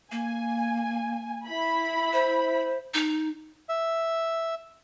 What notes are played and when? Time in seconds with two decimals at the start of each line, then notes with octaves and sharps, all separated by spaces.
0.12 A#3 G#5
1.47 E4 B5
2.13 C5
2.94 D#4
3.69 E5